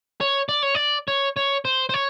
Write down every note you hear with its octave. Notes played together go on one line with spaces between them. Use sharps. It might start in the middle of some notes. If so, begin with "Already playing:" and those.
C#5
D5
C#5
D5
C#5
C#5
C5
C5
C#5